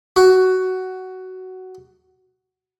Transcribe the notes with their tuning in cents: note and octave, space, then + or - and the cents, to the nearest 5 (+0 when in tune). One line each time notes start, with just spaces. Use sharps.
F#4 +10